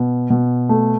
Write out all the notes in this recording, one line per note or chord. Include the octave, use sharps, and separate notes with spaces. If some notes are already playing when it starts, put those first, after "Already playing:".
Already playing: B2
B2
A3